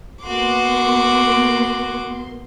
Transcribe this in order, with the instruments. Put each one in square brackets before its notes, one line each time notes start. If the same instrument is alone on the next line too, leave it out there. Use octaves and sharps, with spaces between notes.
[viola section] A#3 B3 C6 [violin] F#4 D6